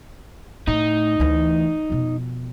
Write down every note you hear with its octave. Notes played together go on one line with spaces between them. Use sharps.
A2 D#4
D2 E3
F2 B2